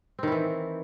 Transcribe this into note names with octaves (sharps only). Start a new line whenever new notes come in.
D#3 E3 C4 E4